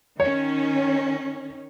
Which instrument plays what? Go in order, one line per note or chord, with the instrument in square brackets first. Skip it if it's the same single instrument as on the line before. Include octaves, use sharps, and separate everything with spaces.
[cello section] D#3 C#4 [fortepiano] C#5